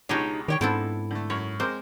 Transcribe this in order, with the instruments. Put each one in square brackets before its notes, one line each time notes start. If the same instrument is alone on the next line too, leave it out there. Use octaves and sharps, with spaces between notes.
[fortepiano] C#2 B2 G#3 [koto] D4 G#4 [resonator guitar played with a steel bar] D#4 G4 C#5
[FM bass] D#3 [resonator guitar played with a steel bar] G4 C#5 G5
[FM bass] G#2 [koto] B3 C4 D4 [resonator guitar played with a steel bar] E4 A4
[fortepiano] D3 A3
[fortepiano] F#2 [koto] C#5
[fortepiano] G#3 A#4 D6 [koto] C4 [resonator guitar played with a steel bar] C5